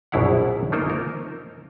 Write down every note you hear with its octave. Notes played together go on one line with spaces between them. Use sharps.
A#1 F#2 B2 E4 F5 F#5
A3 A#3 D#4 F4 A#4 C5
A#4